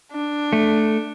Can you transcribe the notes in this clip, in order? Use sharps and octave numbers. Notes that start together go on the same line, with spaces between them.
D4
A3